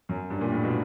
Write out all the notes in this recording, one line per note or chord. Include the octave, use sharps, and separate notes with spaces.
F#2
G2
A#2
A2
B2